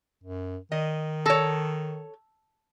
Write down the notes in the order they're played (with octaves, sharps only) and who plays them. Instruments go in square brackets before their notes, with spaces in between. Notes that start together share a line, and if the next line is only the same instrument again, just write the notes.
[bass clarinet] F#2
[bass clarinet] D#3 [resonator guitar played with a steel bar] D#5
[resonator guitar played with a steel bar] A4 C#5 [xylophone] A5 E6 A#6